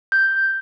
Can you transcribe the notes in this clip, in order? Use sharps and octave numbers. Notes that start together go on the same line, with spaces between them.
G6